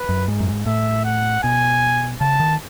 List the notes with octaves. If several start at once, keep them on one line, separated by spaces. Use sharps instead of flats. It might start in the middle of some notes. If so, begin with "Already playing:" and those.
Already playing: B4
F#2
G#2
F#2
G#2
A2 E5
F#5
B2 G#5
C#3 A5
D#3